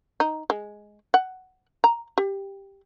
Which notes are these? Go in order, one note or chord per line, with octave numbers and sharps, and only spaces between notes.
D#4
G#3
F#5
A#5
G4